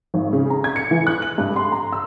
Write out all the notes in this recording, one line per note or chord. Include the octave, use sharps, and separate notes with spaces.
G#1
C#3
A#5
G#6
C#7
E3
F#6
F#7
G2
C6
A#5
E6